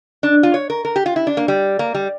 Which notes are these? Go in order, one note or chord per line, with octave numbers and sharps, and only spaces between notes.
D4
F4
C#5
A#4
A#4
G4
F4
E4
D4
A#3
G3
A#3
G3